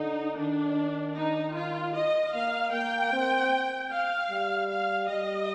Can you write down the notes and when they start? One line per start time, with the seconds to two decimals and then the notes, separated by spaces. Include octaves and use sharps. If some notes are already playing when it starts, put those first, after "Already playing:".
Already playing: D3 D#4
0.37 D#3 D4
1.16 D#4
1.56 F4
1.95 D#5
2.34 A#3 F5
2.73 A#3 G5
3.13 C4
3.91 F5
4.31 G3
4.70 F5
5.09 G3 D#5